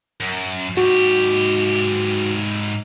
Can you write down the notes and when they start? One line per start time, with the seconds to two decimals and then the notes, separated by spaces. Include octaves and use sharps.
0.20 F#2
0.77 G#2 F#4 G4